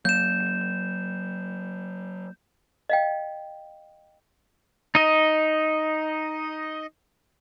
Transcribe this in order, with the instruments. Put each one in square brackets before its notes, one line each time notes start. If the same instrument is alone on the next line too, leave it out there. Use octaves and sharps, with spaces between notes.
[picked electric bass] F#3 A#3 [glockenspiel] G6 E7
[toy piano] D#5 F5 G5
[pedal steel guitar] D#4 D#5